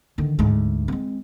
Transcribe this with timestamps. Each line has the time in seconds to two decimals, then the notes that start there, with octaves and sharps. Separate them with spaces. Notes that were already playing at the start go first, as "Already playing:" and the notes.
0.18 D3 D#3
0.39 D2 G#2
0.88 G#3 C4